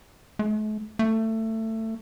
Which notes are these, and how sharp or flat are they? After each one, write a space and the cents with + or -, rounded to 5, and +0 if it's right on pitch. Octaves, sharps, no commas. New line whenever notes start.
A3 -45
A3 +20